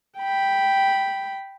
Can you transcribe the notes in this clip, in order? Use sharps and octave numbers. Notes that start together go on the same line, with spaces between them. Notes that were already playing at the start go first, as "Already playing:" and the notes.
G5 B5